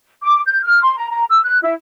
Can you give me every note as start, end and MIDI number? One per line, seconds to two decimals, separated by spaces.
0.22 0.41 86
0.47 0.63 91
0.63 0.82 89
0.83 0.94 84
0.96 1.09 82
1.10 1.24 82
1.30 1.41 88
1.44 1.59 90
1.63 1.74 64